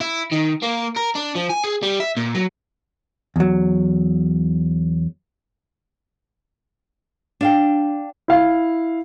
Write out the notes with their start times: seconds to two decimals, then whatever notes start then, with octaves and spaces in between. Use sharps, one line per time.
0.01 E4
0.32 D#3
0.63 A#3
0.97 A#4
1.15 D4
1.36 F3
1.50 G#5
1.64 G#4
1.83 G3
2.00 E5
2.17 A#2
2.35 F#3
3.36 E2 F#3
7.41 D4 F5 G5
8.28 E4 F5